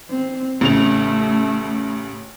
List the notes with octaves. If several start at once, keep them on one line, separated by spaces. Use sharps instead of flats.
C4
A1 C#3 A3 F7